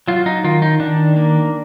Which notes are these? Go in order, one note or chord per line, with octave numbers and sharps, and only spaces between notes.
F#3 F4
D#4
D#3 F4
D#4
D#3 D4
A#3